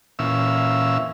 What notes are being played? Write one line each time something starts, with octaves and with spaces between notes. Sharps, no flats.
A#2 E3 C#4 E5 F5 E6